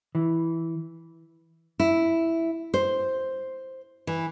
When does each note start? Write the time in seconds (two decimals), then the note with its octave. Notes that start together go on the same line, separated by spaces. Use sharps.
0.15 E3
1.80 E4
2.74 C5
4.07 E3